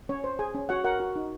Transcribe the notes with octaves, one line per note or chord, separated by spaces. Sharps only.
C#4 C#5
C5
G#4 G#5
C#4
F#4 C#5 F#5
F#4 A#4 F#5
F#4
D#4